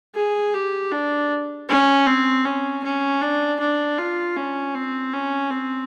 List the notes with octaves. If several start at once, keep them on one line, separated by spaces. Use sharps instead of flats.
G#4
G4
D4
C#4
C4
C#4
C#4
D4
D4
F4
C#4
C4
C#4
C4